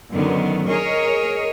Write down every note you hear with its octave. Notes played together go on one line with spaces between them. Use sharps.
F#2 D3 D#3 B3
G#4 A#4 C#5 D#5